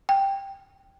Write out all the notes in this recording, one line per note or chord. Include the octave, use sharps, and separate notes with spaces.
G5